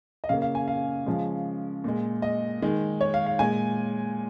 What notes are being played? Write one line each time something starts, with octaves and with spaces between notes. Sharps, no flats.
D#5
C#3 A#3 F5
F5
G#5
F5
C#3 F3 G#3
A#2 G#3
D#5
D#3 G#3
C#5
F5
F5
A#2 G#3 G#5